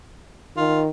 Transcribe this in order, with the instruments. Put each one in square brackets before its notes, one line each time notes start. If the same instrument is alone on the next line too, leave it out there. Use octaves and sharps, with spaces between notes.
[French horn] D#3 [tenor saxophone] F4